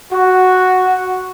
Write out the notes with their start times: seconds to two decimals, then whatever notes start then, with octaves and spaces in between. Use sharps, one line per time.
0.12 F#4